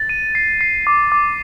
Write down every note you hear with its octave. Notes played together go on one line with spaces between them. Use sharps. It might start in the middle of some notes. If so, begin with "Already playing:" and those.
Already playing: A6
D#7
C7
C7
D6
D6